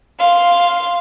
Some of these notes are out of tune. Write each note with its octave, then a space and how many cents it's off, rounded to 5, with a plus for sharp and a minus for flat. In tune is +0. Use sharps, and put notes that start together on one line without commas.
F5 +0 C6 +0